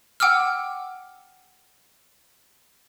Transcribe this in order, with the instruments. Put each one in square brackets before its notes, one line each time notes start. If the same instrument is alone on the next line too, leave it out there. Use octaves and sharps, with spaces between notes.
[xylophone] F#5 G5 D6 E6 F6